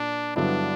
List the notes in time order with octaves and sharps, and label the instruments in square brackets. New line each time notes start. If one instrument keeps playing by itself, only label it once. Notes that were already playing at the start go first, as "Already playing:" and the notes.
Already playing: [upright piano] A#2 [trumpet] D4
[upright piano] G2 D3 F#3 B3 E4 [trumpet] D4